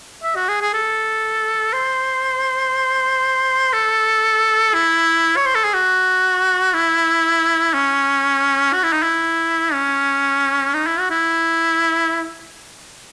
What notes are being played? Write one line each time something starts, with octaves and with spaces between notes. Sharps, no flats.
E5
F#4
G#4
G#4
A4
C5
A4
E4
C#5
C5
A4
G#4
F#4
E4
C#4
F#4
E4
D#4
E4
C#4
D#4
E4
F#4
E4